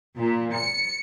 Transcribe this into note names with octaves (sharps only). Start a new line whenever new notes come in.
A#2
C#7